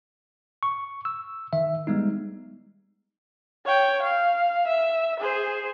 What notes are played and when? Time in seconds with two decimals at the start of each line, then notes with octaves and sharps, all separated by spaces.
0.63 C#6
1.05 E6
1.53 D#3 E5
1.87 G3 G#3 B3 D#4
3.65 C#5 G5
4.02 F5
4.67 E5
5.19 G#4 C5